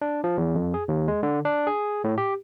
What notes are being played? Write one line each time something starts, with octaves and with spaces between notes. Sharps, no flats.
D4
F3
E2
F2
G#4
D#2
G#3
D3
D4
G#4
A2
G4